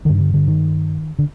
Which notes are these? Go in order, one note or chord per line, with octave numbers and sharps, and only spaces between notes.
G2 D3 D#3
D3
D3
D#3
D3